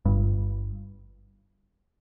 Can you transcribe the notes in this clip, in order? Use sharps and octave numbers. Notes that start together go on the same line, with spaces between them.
G1 G2